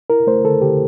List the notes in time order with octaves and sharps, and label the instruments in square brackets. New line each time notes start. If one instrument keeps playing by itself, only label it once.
[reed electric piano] E4 A#4
A3 C5
D3 A4
D3 G4